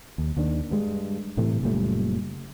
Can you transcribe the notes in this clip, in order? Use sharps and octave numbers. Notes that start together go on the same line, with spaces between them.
D#2
D#2 D#3 D4
G2 G#3
A2 C3 E3 A3
F#1 A#2 G3 A3